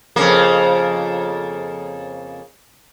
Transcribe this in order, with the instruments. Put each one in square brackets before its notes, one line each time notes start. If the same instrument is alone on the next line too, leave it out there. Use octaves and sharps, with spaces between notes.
[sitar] F2 C#3 A#3